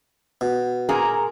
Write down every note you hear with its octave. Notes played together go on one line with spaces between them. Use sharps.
B2
A#2 G#4 A#4